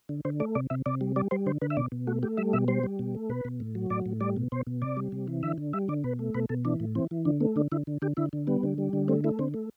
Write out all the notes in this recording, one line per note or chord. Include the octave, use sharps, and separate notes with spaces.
D3
D3 C5
A3 D5
C3 D5
C3 E5
C3 D5
G3
G3 D5
G3 C5
D3 C5
D3 B4
E5
B2 D5
B2
A3 F#4
A3 G4
G3 E5
B2 E5
G3 C5
G3
B2
A3
B2 B4
B2
A2
F#3
A2 D5
A2
G3 D5
B2
B2 C5
B2
C3 D5
G3
C3
E3
D3 E5
D3
G3 E5
D3 D5
B2 B4
A3
B2 B4
B2 A4
E3 D4
A2
E3 C4
E3
D3 D4
A3 B3
D3 D4
D3 E4
D3
D3 G4
D3 E4
D3
G3 B3
D3
G3
D3
A3 C4
A3 E4
D3 C4
A3